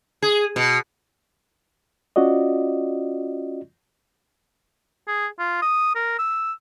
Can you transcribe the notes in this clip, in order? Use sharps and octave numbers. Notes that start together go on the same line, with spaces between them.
G#4
B2
C#4 F4 F#4 D5 D#5
G#4
F4
D#6
A#4
E6